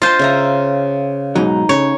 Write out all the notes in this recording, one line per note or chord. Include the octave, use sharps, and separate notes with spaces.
F4 C5 D#5 A5
C#3 E5 A#5
G#2 B2 F#3 D#4
C#3 C#5